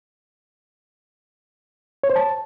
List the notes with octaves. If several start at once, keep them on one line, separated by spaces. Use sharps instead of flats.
C#5
C5
A5